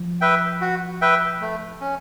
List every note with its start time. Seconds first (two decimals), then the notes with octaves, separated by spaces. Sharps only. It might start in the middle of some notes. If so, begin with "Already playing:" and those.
Already playing: F3
0.21 B4 E5 G5
0.61 F#4
1.01 B4 E5 G5
1.41 A3
1.81 C#4